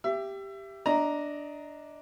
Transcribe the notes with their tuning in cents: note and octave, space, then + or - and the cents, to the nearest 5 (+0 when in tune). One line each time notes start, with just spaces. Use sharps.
G4 +0 E5 +25
D4 +0 D#5 +20 A#5 +0